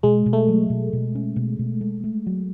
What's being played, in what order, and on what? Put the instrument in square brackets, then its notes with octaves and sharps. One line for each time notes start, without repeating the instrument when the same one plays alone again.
[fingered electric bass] B2 [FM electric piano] G#3
[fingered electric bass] B2
[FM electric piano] A3
[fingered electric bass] F#3
B2
B2
C#4
B2
B2
A3
A3
F#3